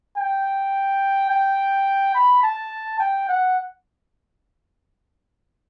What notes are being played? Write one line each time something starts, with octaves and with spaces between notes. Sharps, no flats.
G5
G5
B5
A5
G5
F#5